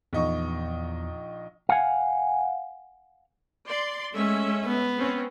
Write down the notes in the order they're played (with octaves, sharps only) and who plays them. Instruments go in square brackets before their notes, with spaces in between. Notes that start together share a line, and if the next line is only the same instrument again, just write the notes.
[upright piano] A#1 D#4 C#6 [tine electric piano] E2
[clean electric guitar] F5 F#5 G#5
[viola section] D5 C6
[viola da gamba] G#3 [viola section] A3 C#4 E5
[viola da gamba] B3
[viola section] C4 C#4